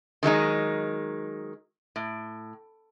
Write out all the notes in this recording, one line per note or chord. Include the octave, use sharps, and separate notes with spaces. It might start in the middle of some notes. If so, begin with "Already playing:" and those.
D#3 F#3 G#3 D#4
A2